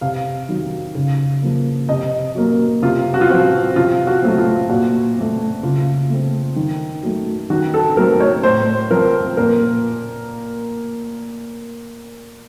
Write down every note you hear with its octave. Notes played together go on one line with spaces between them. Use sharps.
C3 F5
D#3 F#3
C#3
F3 A#3
C3 D#5
F#3 A#3
C3 F4
F#4
F4
F3 C4 F#4
C3 F4
F#4
F#3 A3 C4
F4
A#2 F#4
A3 C4
C#3 F4
A3 C4
D#3
F#3 A3
D#3 F#4
A4
F#3 A3 C4 A#4
C#5
A2 C5
F3 C4 A#4
A#2 A#4